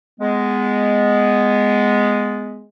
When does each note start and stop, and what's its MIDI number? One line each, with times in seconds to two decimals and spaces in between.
0.19 2.64 56
0.19 2.64 59